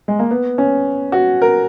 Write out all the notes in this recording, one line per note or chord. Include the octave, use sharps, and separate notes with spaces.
G#3
A#3
B3
C#4
F#4
A#4